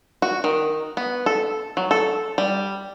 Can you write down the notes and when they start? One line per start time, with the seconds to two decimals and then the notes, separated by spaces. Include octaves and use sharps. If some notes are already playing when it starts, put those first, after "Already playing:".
0.22 F#4
0.44 D#3
0.97 B3
1.26 A4
1.77 F#3
1.91 A4
2.38 G3